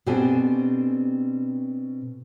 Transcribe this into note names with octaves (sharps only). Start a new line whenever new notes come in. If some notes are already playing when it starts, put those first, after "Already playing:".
B2 C4 D4 G4 A4 G#5